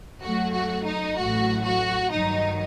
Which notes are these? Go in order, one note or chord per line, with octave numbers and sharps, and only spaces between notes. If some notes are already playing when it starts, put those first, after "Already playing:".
F#2 F#3 A3 F#4
F#4
D#4
A1 A2 F#3 A3 F#4
F#4
G2 D#3 F#3 D#4